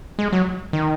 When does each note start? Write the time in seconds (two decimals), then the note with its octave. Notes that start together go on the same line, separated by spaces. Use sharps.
0.19 G#3
0.32 F#3
0.73 D#3